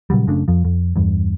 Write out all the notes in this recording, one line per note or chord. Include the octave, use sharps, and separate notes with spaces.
A#2 C#3 F#3 G3
F#1 C#3 A3 D4
F2 F3
F2
E2 G2